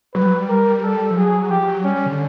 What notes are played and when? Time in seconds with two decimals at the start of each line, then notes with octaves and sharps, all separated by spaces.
0.15 F#3 B4
0.21 G3
0.26 F#3
0.37 G3
0.48 A#4
0.82 A4
1.11 F3
1.16 F#3 G#4
1.50 F3 G4
1.67 F#3
1.84 G3 C#4
1.96 G3
2.06 D3